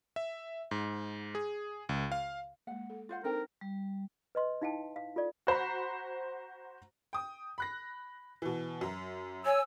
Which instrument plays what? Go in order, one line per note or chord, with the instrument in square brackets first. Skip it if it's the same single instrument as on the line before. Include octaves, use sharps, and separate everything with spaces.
[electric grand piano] E5
G#2
G#4
C#2
F5
[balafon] G#3 A#3 [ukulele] F#5
[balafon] A4
[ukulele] F4 C5 F#5
[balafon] C4 D#4 C5 [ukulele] D4 A4 G5 [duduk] A#4
[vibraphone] G3
[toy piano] B4 D#5 C6
D#4 E4 F5 G5 A5
F5
F4 A4 D5
[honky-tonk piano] F#4 C5 A#5 B5
G5 D#6
B5 F#6 A#6
B2 E3
F#2 A#5
[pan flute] C#5 [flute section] G#5 E6